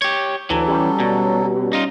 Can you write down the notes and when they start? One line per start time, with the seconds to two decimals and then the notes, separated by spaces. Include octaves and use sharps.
0.02 G4 C#5
0.50 D2 E3 F#3 A4
0.67 G3 C#4
1.00 B2
1.73 D#4 F4